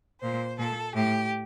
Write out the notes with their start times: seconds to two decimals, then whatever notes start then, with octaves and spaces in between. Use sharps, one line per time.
0.21 A#2 C5
0.58 A#2 A4
0.94 A2 G4